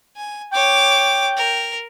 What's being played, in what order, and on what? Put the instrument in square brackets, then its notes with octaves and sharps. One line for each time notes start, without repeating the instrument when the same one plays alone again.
[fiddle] G#5
[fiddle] C#5 D6 [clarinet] G5
[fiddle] A#4